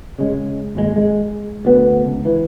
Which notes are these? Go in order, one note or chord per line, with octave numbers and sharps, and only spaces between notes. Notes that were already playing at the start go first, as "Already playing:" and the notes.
C#3 G#3
G#1 D#2 B2 G#3
G#3
D2 B3
C#2
E3